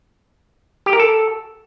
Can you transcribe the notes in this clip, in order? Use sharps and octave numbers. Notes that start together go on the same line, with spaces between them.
G4
A#4
A4